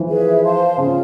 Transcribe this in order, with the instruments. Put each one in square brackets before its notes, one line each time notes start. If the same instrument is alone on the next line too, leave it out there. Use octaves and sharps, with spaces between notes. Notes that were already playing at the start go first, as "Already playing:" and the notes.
Already playing: [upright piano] E3 F3
[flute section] G#4 B4 E5
C5 F5 A5 C6
[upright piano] C#3 [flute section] C#4 F4 G#4